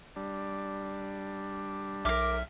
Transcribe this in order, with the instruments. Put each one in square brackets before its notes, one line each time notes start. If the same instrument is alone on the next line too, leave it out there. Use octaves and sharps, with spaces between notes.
[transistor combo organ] G3 D4
[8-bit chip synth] B1 E5 F6 [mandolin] A#4 D6